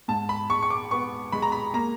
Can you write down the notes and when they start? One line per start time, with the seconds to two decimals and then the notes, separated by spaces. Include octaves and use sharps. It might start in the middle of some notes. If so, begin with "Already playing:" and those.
0.08 G#2 A5
0.29 B5
0.50 G#3 C#6
0.62 C#6
0.70 D6
0.91 B3 C#6
1.32 G#3 B5
1.42 A#5
1.52 B5
1.74 A#3 A#5